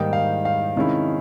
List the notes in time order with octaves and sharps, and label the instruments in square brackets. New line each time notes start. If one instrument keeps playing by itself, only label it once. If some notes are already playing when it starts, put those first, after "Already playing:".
Already playing: [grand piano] G#2 D#3 G3 A#3 D#4 G5
F5
F5
C3 D#3 G#3 C#4 E4